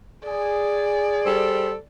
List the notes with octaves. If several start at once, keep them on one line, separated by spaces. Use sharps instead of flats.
G#4 D5
G3 A4 C5